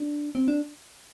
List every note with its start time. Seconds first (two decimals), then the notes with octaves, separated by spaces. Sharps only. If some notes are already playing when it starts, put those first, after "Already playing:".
Already playing: D4
0.35 C4
0.48 D4